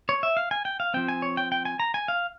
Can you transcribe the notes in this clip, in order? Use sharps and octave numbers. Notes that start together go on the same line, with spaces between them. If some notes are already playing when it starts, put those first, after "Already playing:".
C#5
E5
F5
G#5
G5
F5
F3 C4 G5
G#5
C#5
G5
G5
G#5
A#5
G#5
F5